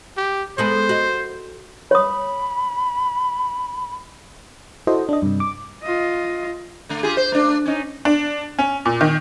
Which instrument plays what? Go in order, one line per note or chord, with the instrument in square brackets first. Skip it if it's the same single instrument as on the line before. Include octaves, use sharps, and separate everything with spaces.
[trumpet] G4
[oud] G#3 B3 A4 [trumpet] C5
[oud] F#4 D#5
[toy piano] C#5 D#6 [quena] B5
[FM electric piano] E4 F#4 A4 C5 D#5
D4 D#5
G2 C3
D6
[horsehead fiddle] F4 D#5
[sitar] D3 A3
F4 G4 G#4
C5
A3 D4
C#4 D#4
[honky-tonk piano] D4
C#4
A#2
D#3